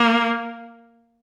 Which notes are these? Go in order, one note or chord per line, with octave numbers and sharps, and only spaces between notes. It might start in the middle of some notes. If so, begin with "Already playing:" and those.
Already playing: A#3